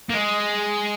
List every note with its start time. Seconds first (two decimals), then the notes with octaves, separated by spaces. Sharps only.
0.10 A#3
0.14 G#3